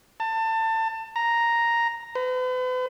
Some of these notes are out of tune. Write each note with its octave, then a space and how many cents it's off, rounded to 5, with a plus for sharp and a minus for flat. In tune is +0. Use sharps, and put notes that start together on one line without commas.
A5 +25
A#5 +0
B4 +45